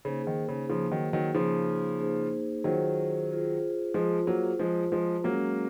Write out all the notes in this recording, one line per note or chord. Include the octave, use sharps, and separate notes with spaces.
C#3 A#3 D#4 G#4 C5
D#3
C#3
C#3 F3 A#3 D#4 G#4 C5
D#3 F#3
D#3 F#3
C#3 F3 A#3 D#4 G#4 C5
A#3 D#4 G#4 C5
D#3 F#3 F4 G#4 C5
F4 G#4 C5
F3 G#3 F4 G#4 C5
F#3 A#3
F3 G#3 F4 G#4 C5
F3 G#3
F#3 G#3 A#3 C#4 G#4